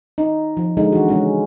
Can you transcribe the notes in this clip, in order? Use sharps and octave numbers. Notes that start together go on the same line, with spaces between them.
D#4
F3
D3 G#3 D#4
E3 F#4
C#3 G#3 C#4